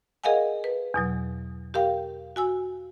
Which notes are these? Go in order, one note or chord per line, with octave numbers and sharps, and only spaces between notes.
G#4 A#4 D#5 F5 F#5 G#5
B4
E2 B2 F#3
G4 A#4 F5 G5
F#4 G#5 E6